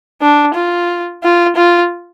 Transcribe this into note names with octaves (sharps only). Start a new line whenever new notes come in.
D4
F4
F4
F4